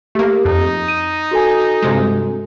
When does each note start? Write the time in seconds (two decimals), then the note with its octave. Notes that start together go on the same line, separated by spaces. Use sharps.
0.15 A3 A#3 G4
0.45 F2 D#4
0.88 D#7
1.31 F#4 A4 G#5
1.82 G2 C3 G#3